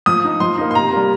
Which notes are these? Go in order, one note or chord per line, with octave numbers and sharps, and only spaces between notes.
F3 D#6
D#4
F3 C6
A#3 D#4
C6
C3 A#5
G3 A#3